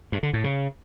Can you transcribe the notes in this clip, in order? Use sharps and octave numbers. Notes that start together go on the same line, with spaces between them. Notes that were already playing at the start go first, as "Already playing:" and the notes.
G2
D3
A2
C#3